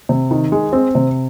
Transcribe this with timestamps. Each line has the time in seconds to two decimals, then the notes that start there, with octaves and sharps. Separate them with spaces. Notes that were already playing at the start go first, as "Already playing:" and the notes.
0.09 C3
0.31 D#3
0.52 G#3
0.73 C4
0.95 C3